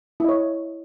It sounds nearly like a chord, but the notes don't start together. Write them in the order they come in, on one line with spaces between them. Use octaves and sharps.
E4 D#5 C#5